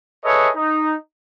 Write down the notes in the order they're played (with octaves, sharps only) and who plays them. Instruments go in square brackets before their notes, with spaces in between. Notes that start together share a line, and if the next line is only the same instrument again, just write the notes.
[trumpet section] G#4 A4 B4 C#5 D#5 E5
D#4